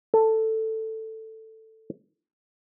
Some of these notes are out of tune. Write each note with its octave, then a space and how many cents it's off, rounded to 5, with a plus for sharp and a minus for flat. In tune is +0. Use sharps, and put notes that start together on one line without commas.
A4 +10